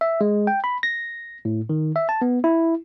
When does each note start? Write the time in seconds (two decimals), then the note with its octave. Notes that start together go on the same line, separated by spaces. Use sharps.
0.01 E5
0.21 G#3
0.47 G5
0.64 B5
0.83 A#6
1.45 A2
1.69 D#3
1.96 E5
2.09 A5
2.22 B3
2.44 E4